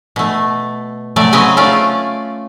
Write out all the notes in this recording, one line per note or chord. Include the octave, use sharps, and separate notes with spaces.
B2 A3
C3 F#3 A3 D5
C#3 F#3 C4 B4 D#5 G#5
A3 C#4 F4 D5